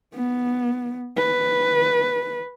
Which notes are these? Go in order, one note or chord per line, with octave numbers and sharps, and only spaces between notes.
B3
B4